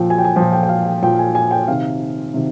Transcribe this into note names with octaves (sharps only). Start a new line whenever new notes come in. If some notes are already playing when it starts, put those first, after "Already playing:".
Already playing: A#2 F3 G5
G#5
G5
G#5
A#2 F3 G5
G5
G5
F5
G5
A#2 F3 G5
G#5
G#5
G5
C3 D#3 F5
C3 D#3